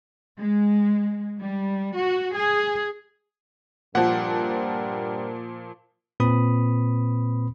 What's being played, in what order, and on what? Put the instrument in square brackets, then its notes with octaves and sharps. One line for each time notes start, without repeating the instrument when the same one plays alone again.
[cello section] G#3
G3
F#4
G#4
[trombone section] G2 G3 A#4 [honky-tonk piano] A#2 F3 [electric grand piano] F#5
[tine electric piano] A#2 C4 B4 B5 D#6